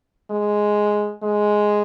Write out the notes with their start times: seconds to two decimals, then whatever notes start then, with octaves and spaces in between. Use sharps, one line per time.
0.31 G#3
1.23 G#3